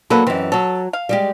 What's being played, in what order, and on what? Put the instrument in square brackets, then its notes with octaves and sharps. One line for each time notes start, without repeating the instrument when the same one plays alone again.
[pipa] D3 B4 F#5 [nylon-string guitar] F#3 A#3 A4
[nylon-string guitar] F#2 E3 [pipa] G#3 C4
[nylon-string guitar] F#3 C#5 [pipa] A4
[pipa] F5
[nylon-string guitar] G3 G#3 G4